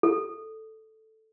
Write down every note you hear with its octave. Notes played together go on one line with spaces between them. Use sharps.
A4